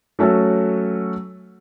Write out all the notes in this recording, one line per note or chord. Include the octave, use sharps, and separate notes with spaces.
F#3 A3 C#4 F#4 A4